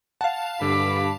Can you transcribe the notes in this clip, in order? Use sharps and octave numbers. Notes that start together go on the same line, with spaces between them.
F5 F#5 A5
G2 D3 B5 D6